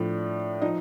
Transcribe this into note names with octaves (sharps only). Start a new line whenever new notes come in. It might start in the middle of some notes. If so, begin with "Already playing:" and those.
Already playing: A2 F3 D4 D5
F3 D#4 D#5